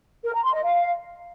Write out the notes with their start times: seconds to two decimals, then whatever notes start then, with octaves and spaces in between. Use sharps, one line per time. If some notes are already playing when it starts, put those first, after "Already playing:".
0.24 A#4
0.34 A#5
0.44 C6
0.54 D#5
0.64 F5